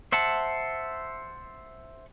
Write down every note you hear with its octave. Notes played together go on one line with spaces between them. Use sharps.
C5 E5 F#5 A5